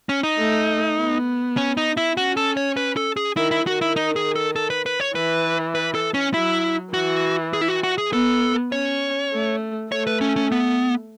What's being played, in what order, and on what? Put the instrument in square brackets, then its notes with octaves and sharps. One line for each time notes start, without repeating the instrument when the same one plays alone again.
[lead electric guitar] C#4
D#4
[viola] A3
B3
[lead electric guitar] C#4
D#4
E4
[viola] C#4 [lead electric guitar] F#4
[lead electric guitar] A4
C#5
B4
A4
G#4
[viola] D#3 [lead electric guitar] E4
[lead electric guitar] E4
[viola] D#3 [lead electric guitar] F#4
[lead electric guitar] E4
D#4
G#4
A4
A4
B4
B4
C#5
[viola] E3 [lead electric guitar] B4
[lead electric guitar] B4
A4
C#4
[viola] F#3 [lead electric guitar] E4
[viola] E3 [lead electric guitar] F#4
[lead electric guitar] G#4
E4
F#4
F#4
G#4
[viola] B3 [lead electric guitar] A4
[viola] C#4 [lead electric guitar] C#5
[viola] A3
[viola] A3 [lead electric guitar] C#5
[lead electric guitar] B4
C#4
C#4
B3